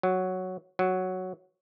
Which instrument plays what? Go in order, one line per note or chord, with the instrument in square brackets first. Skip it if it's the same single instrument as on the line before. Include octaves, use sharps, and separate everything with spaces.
[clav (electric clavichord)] F#3
F#3